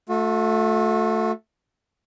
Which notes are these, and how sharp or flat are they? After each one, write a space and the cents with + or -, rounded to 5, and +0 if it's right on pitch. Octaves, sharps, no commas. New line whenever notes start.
A3 +0 F#4 -45